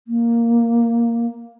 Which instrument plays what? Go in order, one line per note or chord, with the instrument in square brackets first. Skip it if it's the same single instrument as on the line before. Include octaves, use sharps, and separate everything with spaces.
[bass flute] A#3